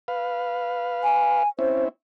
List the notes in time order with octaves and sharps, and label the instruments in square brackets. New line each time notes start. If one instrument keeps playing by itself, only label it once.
[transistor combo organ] B4 F5
[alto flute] G#5
[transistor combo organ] C4 C#4 E4 [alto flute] C5